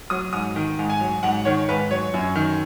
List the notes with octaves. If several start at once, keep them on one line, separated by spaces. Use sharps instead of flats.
F#3 D#6
G#2 D#6
D#3
G#2
G#5
F#3
G#2 F#5
D#3 C#5
G#2 B4
F#3 C#5
F#2
D#3